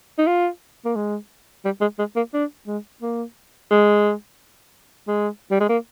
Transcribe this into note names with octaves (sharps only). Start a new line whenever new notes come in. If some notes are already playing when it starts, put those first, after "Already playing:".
D#4
F4
A#3
G#3
G3
G#3
G#3
A#3
D4
G#3
A#3
G#3
G#3
G3
G#3
A#3